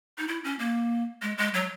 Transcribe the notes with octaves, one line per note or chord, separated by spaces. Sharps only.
D#4
E4
C#4
A#3
G#3
G#3
F#3